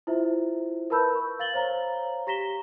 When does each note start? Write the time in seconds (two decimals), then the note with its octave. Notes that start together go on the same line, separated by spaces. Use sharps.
0.07 E4 F4 C5 E5
0.90 A#4 B4 A5 B5 E6 G6
1.15 C#6
1.39 F5 A6 F#7 G7
1.54 C5 C#5 F5 A#5
2.27 G4 A#5 A#6 B6 E7 G7